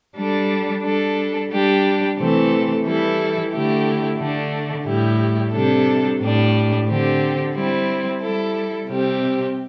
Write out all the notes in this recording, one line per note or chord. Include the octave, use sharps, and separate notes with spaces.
G3 D4 A4
G3 D4 A4
G3 D4 G4
C3 E3 A3 C4 A4
E3 G3 E4 A4
D3 A3 E4 G4
D3 A3 D4
A2 G3 E4 G4
C3 G3 D4 A4
A2 G3 D4
D3 C4 G4
G3 C4 E4
G3 E4 A4
C3 G3 C4 G4